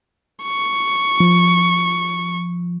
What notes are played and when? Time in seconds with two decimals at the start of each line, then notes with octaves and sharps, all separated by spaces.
0.43 C#6
1.20 F3